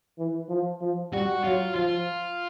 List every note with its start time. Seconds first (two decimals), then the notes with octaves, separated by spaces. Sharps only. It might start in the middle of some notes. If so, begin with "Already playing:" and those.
0.19 E3
0.49 F3
0.81 F3
1.13 G3 F#4
1.44 F#3 F4
1.75 F3 F4